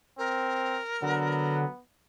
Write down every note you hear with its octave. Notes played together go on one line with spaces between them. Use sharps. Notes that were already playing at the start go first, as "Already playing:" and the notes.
C4 A#4
D3 F#3 B3